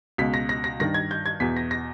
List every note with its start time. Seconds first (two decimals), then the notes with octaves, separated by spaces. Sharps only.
0.18 C#2 B2 B6
0.34 A#6
0.49 A#6
0.64 A#6
0.80 G2 D#3 A#6
0.94 G#6
1.11 G6
1.26 G#6
1.40 E2 B2 B6
1.57 A#6
1.71 A#6